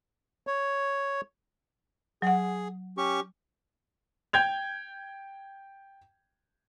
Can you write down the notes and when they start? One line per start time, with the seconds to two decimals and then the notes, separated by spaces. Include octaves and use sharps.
0.47 C#5
2.22 F#3 G#4 F#5
2.98 C#4 G4 C#6
4.33 G5 G6 G#6 F7